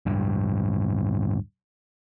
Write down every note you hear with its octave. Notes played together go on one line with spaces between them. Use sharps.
D1 G2